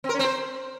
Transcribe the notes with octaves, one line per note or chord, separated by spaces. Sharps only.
C4
A#4
C#4
C4
C5